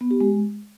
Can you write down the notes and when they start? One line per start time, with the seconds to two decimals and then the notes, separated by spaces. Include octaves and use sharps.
0.01 B3
0.11 G4
0.20 G#3